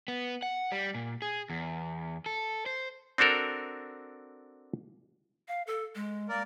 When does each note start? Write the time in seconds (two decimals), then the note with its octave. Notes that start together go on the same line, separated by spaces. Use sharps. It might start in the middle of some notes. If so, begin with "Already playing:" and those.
0.08 B3
0.43 F#5
0.72 G3
0.95 A#2
1.22 G#4
1.50 E2
2.26 A4
2.66 C5
3.18 C4 D4 F#4 A4 A#4
5.48 F5
5.67 A4
5.95 G#3
6.29 A#3 A#4 D5